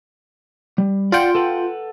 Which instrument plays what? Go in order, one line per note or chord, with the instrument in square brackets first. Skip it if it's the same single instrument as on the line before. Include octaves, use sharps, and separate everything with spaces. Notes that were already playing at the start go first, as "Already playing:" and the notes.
[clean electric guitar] G3
[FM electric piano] F4 G5 [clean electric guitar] D5 F#5
[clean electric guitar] A4 B4 F#5